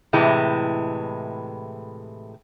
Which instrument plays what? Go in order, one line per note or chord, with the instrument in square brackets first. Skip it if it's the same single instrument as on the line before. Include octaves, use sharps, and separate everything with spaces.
[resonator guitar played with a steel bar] A2 C3 E3 G#3